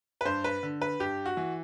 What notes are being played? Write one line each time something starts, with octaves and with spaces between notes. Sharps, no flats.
B4
G2 C5
B4
D3
B4
G2 G4
F#4
E3